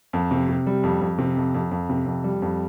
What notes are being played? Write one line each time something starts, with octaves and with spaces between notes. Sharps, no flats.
F2
C3
C3
G3
F2
F2
C3
F2
F2
F2
C3
F2
G3
F2